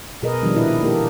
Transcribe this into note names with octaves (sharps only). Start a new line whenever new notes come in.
B2 G#4 A#4 B4 D#5
D#3 F3 G3 D4
A#2 E4 B4 D#5
A#3 G4 A4 A#4